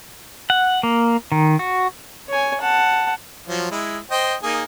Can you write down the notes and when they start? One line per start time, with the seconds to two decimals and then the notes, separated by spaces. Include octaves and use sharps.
0.50 F#5
0.83 A#3
1.32 D#3
1.59 F#4
2.29 C#5 G#5
2.61 F#5 A5
3.48 F3 F#3
3.71 G#3 E4
4.11 C5 D#5 G5
4.43 A#3 D#4 G#4